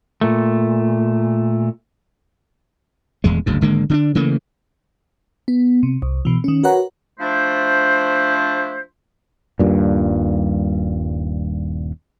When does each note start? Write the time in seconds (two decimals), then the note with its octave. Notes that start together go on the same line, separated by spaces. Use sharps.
0.21 A#2 A3
3.24 D#1 E2 G#3
3.46 F#1 D2 G#2
3.61 G#1 D3 G#3 A#3
3.90 D3 C4 D4
4.15 C#3 E3 A3 A#3
5.48 B3
5.83 C3
6.02 C2
6.25 B2 E3
6.44 D#3 C#4
6.63 F#4 A#4 B4 C#5 F#5 A#5
7.20 F3 A3 D4 E4 C5
9.59 D#1 G#1 G2 A#2